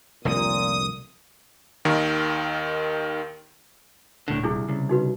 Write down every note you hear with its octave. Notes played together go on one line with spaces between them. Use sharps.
F1 C2 A#2 D3 D#6
D#2 D#3 A#4
D#1 A2 D3
C2 D4 E4 G#4
C2 C#3
D#4 F#4 B4